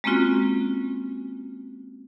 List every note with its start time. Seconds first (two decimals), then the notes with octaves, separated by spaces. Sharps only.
0.04 G#3 A#3 C4 C#4 F4 F#4